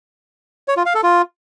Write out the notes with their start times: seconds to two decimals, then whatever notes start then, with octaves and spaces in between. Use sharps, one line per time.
0.68 C#5
0.77 F4
0.86 F5
0.95 A4
1.03 F4